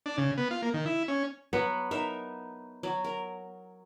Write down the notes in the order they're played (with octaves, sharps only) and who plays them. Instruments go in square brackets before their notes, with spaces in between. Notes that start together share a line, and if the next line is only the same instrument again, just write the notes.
[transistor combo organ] D4
C#3
B3
F4
A#3
D#3
E4
C#4
[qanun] F#3 [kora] B3
[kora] D#4 [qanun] A#4 E5
[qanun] F#3
A#4